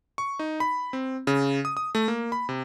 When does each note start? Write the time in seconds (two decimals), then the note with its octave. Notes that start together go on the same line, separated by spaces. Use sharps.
0.18 C#6
0.39 D#4
0.60 B5
0.93 C4
1.27 C#3
1.65 D#6
1.77 D#6
1.95 A3
2.08 A#3
2.32 B5
2.49 C3